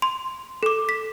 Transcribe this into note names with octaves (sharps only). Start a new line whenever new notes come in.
C6
A4 D6
B6